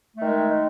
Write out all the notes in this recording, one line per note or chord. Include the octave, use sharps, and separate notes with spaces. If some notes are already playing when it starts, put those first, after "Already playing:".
D#3 G#3 A3